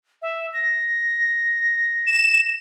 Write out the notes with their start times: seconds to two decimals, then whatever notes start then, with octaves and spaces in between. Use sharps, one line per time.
0.22 E5
0.53 A#6
2.06 E7